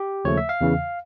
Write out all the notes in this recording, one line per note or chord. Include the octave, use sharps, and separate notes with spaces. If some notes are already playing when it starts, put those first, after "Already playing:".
Already playing: G4
D#2 C#3 F3 A3 C#5
E5
F5
E2 C#3 E3